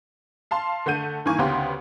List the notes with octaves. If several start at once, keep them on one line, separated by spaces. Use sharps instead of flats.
F5 A5 C6
D3 A3 F#5 G6 D#7
G2 D#3 E3 A#3 G#5 C#6
D2 C#3 B3 G4 C6